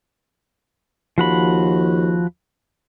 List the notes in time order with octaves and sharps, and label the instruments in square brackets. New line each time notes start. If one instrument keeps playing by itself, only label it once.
[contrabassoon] D#2 [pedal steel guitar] F3 F#4 B5